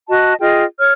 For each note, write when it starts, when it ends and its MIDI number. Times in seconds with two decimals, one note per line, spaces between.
0.09 0.34 66
0.09 0.34 75
0.09 0.34 81
0.40 0.64 65
0.40 0.64 68
0.40 0.64 75
0.40 0.64 79
0.79 0.93 73
0.79 0.93 89